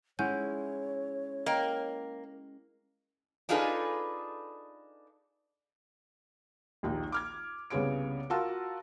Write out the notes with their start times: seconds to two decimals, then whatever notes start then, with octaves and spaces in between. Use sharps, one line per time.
0.19 G#3 C#4 E4 C#5 F#5 G#5 G6
1.46 A#3 D#5 G5
3.49 D4 D#4 F4 G#4 A4 B4
6.83 A#1 D#2 D#4 G5
7.12 D6 F6 G#6
7.70 C2 C#3 B3 G#4 C#5 D7
8.30 F4 F#4 A#4 F#5 A5 E6